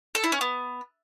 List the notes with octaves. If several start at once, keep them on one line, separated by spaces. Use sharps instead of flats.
A4
E4
C#4
B3